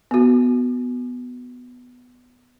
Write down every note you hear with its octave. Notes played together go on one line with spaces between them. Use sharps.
B3 F#4